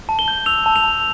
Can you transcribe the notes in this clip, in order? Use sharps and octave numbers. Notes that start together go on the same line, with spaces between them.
A5
G7
G6
E6 F7
A5
F7
A5